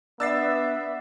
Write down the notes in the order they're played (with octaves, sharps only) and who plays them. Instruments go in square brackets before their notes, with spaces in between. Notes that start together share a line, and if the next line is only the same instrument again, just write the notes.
[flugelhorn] B3 [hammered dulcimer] D4 [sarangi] E5 [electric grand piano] E6 A6 C7